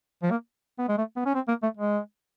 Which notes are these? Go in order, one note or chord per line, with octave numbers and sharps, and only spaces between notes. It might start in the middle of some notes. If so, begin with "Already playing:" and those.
F3
A#3
B3
G#3
A3
B3
C#4
C4
A#3
A3
G#3